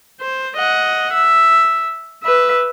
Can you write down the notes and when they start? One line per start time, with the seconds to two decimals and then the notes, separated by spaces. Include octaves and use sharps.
0.21 C5
0.57 D#5 F#5
1.13 E5
2.23 B4 E5